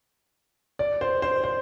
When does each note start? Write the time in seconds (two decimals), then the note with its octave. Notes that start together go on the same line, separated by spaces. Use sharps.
0.79 D5
1.01 C5
1.22 C5
1.44 C5